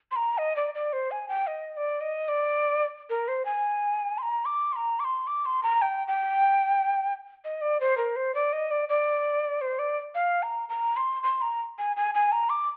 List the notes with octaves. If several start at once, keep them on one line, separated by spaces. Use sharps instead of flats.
C6
A#5
D#5
D5
D5
C5
G#5
G5
D#5
D#5
D5
D#5
D5
A#4
C5
G#5
C6
A#5
D6
C6
A#5
D6
C6
D6
C6
A#5
G5
G5
D#5
D5
C5
A#4
C5
D5
D#5
D5
D5
C5
D5
F5
A#5
A#5
C6
C6
A#5
G#5
G#5
G#5
A#5
D6